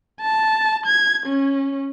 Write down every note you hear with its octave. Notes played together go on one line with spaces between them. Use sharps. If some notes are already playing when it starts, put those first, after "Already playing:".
A5
G#6
C#4